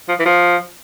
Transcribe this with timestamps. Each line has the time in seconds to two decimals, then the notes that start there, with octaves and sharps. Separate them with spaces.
0.08 F3
0.19 E3
0.25 F3